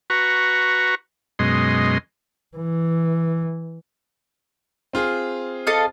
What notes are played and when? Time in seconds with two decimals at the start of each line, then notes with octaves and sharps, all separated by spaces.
0.10 F#4 B4 A#5 C#6
1.39 F#2 B2 G#3 D#5 C6
2.57 E3
4.93 C4 F4 G#4
5.67 A4 D#5 F5